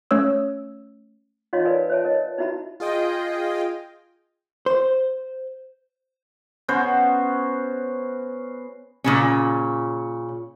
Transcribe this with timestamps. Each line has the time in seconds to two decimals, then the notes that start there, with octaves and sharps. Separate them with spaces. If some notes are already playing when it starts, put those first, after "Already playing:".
0.11 A3 C#4 C#5 E6
1.53 D#4 F4 C#5 D#5 F5 C6
1.65 A#4 B4 D5 G#5
1.90 C5 C#5 E5 G#5 A5
2.05 A#4 D#5
2.38 D#4 E4 F#4 E5 A5 B5
2.80 F4 G#4 D#5 G5
4.66 C5
6.68 B3 C#4 F#4 C5
9.04 A#2 C#3 C#4